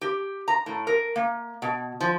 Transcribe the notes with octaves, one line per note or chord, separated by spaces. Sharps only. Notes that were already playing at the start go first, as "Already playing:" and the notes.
G4
A#5
A2
A#4
A#3
B2
F3